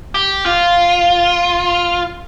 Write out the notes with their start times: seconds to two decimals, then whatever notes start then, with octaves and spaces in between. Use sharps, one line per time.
0.15 G4
0.46 F4